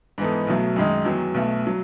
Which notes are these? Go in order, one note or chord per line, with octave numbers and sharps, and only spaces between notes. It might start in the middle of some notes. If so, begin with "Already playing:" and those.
G#2 E3 B3 D#4 A4
B1 B2 F#3 A3
F#2 D#3 G#3 D#4
E2 D#3 F#3
B1 B2 A3
F#3